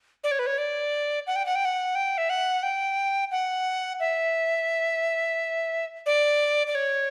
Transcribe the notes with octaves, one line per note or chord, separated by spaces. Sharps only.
D5
C#5
B4
C#5
D5
F#5
G5
F#5
G5
F#5
G5
E5
F#5
G5
F#5
E5
D5
D5
C#5